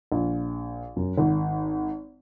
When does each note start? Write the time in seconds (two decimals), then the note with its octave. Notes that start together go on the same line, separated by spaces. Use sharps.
0.12 A#1
0.96 F#2
1.18 G#1